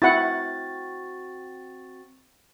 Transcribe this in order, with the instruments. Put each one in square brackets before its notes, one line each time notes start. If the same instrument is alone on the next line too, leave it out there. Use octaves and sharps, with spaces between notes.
[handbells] C4 F#4 A6 [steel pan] E4 F#5